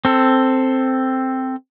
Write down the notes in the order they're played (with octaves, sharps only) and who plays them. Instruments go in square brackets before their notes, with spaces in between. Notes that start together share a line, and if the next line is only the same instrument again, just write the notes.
[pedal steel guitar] C4 A4